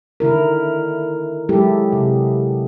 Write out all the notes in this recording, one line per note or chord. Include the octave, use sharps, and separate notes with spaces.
D3 D#3 E4 A#4
F#3 G#3 E4 G4 A4
C3